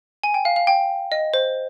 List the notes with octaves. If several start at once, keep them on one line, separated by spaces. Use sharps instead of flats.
G#5
G5
F5
F5
G5
D#5
C5